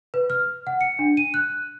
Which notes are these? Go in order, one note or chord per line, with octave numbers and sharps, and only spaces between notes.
B4
F6
F#5
C#7
D4
D#7
F#6